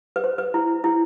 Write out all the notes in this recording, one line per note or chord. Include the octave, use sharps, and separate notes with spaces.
B4
C5
B4
E4
E4